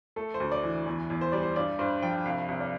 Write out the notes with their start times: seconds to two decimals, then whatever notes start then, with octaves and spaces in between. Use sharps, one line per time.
0.16 A3 A4
0.34 C5
0.40 D2
0.52 D5
0.63 E3
0.86 E2
1.10 E2
1.21 C5
1.32 G3 D5
1.43 C5
1.56 G2 D5
1.79 G2 C5
2.02 F3 G5
2.25 C2 F5
2.48 C2
2.60 D5